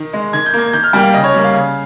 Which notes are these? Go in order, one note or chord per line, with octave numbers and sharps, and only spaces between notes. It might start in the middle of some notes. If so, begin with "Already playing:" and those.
Already playing: D#3
G#3
D#3 G#6
G6
A#3
G#6
D#3 G6
F6
G3 A#3 G5
F5
C#3 D#5
C#5
G3 A#3
F5
C#3